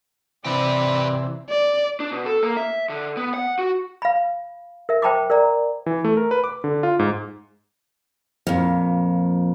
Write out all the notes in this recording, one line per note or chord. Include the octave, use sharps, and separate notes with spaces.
C3 E3 C4 G4 B4 D5
D5
D4
B2
A4
A#3
E5
D3
B3
F#5
F#4
F5 B5
A#4 E5
C5 G5 A5 B5 D6
A#4 D5 A#5
E3
A3
A#4
B4
D6
D3
F4
G#2
F2 A#2